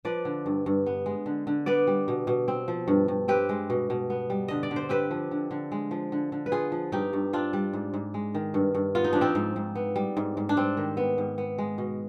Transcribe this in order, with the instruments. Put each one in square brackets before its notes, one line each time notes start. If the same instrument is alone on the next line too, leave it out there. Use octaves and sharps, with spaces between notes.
[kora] F3 B4 D5
D3
G2
G2
B3
G#3
D3
D3
B3 B4 D5
G3
B2
B2
C4
F3
G2
G2
C4 G4 B4
G#3
B2
B2
B3
G3
D3 D#5
D5
D3
C5
C4 G4 B4
F3
D3
D3
G#3
F3
D3
D3
B4
B3 F4 G#4
F3
G2 D#4 G4
G2
C4 D4 F4
G3
G#2
G#2
G#3
D#3
G2
G2
B3 F4
D#4
F3 D4
C4 D#4
G#2
G#2
B3
G3
G#2
G#2
D4
G3 C4
D#3
B3
G#2
B3
G#3
B2